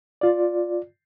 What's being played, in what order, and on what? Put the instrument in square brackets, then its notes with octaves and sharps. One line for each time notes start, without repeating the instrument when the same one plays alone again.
[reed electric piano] F4 D5